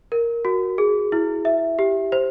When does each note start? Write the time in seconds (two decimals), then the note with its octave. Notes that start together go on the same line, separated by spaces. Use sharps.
0.12 A#4
0.45 F#4
0.78 G#4
1.12 E4
1.45 E5
1.79 G4
2.12 C5